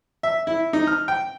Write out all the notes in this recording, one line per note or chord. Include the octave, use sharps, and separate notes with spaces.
E5
E4
D#4
F6
G5